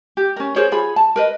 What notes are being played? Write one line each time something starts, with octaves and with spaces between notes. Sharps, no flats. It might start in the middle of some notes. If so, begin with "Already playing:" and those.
G4
C#4 A#4
G#4 A#4 C5 C#5
F4 G#4 C#5 B5
A5
A#4 B4 D#5